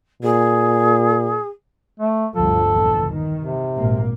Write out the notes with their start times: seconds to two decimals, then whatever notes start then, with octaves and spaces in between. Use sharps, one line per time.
0.23 A#2 G#4
2.00 A3
2.35 G1 D2 F3 A4
2.72 A#1 E2 D3
3.09 D#3
3.40 C3
3.76 G#1 A#2 A#3